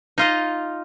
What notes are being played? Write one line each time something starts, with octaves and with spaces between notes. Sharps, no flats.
D#4 F4 D#5